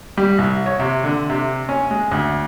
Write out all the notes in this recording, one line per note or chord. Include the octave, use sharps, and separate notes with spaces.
G3
C2
C#5
C3
D3
C3
C#4
G#3
D2